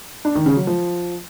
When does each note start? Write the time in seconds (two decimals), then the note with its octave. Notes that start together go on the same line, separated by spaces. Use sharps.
0.25 D4
0.35 D#3
0.46 C#3
0.57 F#3
0.67 F3